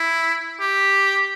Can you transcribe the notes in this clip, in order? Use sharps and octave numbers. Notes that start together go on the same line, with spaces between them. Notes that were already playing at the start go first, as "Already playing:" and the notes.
Already playing: E4
G4